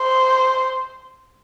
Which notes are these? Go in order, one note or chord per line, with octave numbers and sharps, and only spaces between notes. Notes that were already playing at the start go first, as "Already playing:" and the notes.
Already playing: C5